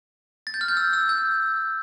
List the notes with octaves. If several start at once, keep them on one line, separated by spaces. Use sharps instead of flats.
A6
G6
F6
G6
E6
E6
G6